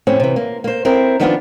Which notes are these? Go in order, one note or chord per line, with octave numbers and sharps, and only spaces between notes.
A2 F3 C4 C#4
C3 E3
A#3
A#3 C5
C4 E4 A#4
D#3 F3 G3 B3 D4 F4